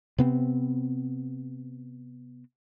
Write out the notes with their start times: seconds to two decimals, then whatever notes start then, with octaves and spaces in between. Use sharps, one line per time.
0.18 C3 B3 C4